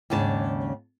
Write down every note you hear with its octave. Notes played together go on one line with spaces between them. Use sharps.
D#2 G#2 C#3 D4 A5